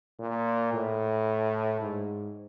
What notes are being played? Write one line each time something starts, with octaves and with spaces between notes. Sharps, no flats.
A#2
A2
G#2